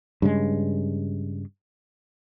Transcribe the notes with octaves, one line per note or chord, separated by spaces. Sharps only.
G2 C#3 G#3